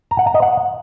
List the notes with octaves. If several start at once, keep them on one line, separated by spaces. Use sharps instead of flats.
A#5
F#5
A#5
D#5
F#5